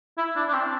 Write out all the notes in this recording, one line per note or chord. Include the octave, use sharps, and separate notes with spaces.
E4
D4
D4
C4